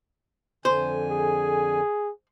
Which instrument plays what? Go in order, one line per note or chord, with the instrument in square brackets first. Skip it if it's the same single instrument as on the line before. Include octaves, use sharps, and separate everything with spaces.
[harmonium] F2 D3 G#5 [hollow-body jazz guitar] C5
[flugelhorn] G#4